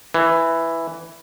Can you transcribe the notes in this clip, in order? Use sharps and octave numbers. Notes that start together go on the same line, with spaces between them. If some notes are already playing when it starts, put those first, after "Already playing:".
E3